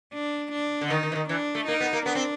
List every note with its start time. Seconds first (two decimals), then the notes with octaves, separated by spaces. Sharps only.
0.13 D4
0.52 D4
0.81 D3
0.90 D#3 D#4
1.03 D#3
1.12 E3
1.16 D#3
1.29 E3 D4
1.55 A3
1.67 A#3 D#4
1.80 B3
1.93 A#3
2.06 B3 D4
2.15 C4